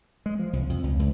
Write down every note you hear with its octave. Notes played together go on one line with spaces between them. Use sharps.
G#3
F3
C2
F2
C#2
C#2